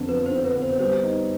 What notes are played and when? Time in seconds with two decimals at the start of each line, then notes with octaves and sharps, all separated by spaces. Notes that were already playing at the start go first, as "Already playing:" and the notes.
Already playing: F2 D3 B3
0.09 F3 B4
0.26 C5
0.31 D3
0.44 B4
0.56 B3
0.62 C5
0.79 G3 C5
1.03 D#4